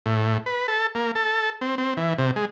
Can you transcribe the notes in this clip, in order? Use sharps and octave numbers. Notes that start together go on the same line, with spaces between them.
A2
B4
A4
A#3
A4
C4
C4
E3
C3
G#3